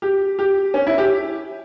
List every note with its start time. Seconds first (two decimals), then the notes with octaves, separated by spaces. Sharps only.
0.02 G4
0.39 G4
0.74 C#4
0.87 E4
0.98 G4